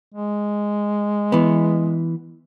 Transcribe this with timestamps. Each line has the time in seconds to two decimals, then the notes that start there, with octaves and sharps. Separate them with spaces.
0.14 G#3
1.32 E3 B3